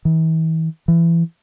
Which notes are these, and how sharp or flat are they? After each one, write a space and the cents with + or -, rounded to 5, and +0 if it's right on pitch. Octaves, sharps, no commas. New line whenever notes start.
E3 -40
E3 +25